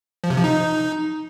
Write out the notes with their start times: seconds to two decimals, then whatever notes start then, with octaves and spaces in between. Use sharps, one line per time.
0.24 F3
0.30 C3
0.37 F3
0.44 D#4